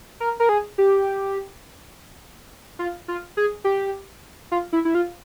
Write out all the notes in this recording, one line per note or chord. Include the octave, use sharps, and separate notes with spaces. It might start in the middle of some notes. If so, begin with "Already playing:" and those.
A#4
A#4
G#4
G4
F4
F4
G#4
G4
F4
E4
E4
F4